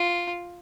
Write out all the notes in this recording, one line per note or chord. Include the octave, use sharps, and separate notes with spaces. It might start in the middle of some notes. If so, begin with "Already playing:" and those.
Already playing: F4